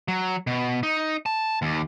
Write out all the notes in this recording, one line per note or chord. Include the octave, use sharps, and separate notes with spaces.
F#3
B2
D#4
A5
D#2